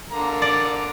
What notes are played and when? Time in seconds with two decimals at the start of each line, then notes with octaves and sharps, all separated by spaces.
0.12 D3 A#3 A#5
0.42 D5